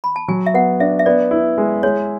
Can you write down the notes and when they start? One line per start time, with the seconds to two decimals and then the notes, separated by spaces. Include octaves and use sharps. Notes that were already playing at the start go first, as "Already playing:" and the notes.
0.04 B5
0.16 A5
0.28 F#3 G#5
0.46 E5
0.54 B3 F#5
0.80 D4 E5
0.99 E5
1.06 B3 D5
1.31 E4
1.58 G#3
1.83 G#3 C#5